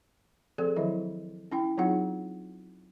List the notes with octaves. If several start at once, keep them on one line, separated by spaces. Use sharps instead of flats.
F3 C4 G#4 A4 D5
D#3 F3 F#3 E4 D#5 E5
C#4 E4 G5
F#3 C4 D#4 F4 G#4 F#5